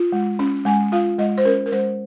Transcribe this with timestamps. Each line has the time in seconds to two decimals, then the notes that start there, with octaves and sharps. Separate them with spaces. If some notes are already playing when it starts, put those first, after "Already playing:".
Already playing: F4
0.12 G#3
0.39 C#4
0.65 G#3 G#5
0.92 F4 F5
1.18 G#3 D#5
1.38 C5
1.45 C#4 A#4
1.66 A#4
1.72 G#3 C5